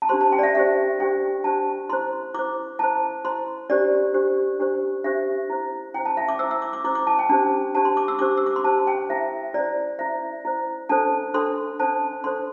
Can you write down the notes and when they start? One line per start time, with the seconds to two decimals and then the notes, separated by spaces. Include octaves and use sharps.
0.02 A5
0.09 D4 G4 C5 C6
0.21 A5
0.32 G5
0.39 D5
0.43 E5
0.55 D4 G4 C5 E5
0.99 D4 G4 C5 G5
1.44 D4 G4 C5 A5
1.89 E4 C5 C6
2.34 E4 C5 D6
2.79 E4 C5 A5
3.24 E4 C5 C6
3.70 D4 G4 C5 D5
4.14 D4 G4 C5
4.59 D4 G4 C5
5.04 D4 G4 C5 E5
5.50 E4 C5
5.94 E4 C5 G5
6.06 A5
6.17 E5
6.29 D6
6.39 E4 C5 E6
6.51 E6
6.62 D6
6.73 D6
6.84 E4 C5 D6
6.95 D6
7.07 A5
7.19 G5
7.29 D4 G4 C5 A5
7.75 D4 G4 C5 A5
7.85 C6
7.97 D6
8.08 E6
8.19 D4 G4 C5 D6
8.37 E6
8.46 D6
8.56 C6
8.64 D4 G4 C5 A5
8.87 G5
9.09 E4 C5 E5
9.54 E4 C5 D5
9.99 E4 C5 E5
10.45 E4 C5
10.89 D4 A4 C5 A5
11.34 D4 A4 C5 C6
11.80 D4 A4 C5 A5
12.24 D4 A4 C5 C6